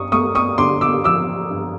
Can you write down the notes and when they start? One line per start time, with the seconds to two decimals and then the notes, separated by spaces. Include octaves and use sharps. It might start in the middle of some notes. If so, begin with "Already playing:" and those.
Already playing: G2 C#6 D#6
0.12 A3 C#6 D#6
0.35 C#6 D#6
0.58 D3 C6 D6
0.81 D6 E6
1.04 F3 D6 E6
1.51 G2